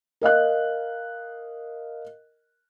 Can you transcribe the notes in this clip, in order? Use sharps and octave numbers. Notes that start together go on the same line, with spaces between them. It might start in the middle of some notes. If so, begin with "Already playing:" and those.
A#4 D#5 F5 F#6